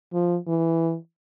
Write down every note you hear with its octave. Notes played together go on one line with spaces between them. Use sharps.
F3
E3